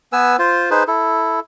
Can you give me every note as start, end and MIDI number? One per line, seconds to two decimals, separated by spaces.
0.13 0.36 59
0.13 0.36 71
0.13 0.36 80
0.13 0.36 88
0.39 0.70 65
0.39 0.70 72
0.71 0.83 63
0.71 0.83 68
0.71 0.83 71
0.71 0.83 72
0.88 1.40 64
0.88 1.40 69